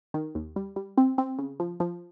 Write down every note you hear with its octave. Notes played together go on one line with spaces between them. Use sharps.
D#3
D#2
G3
G3
C4
C4
C#3
F3
F3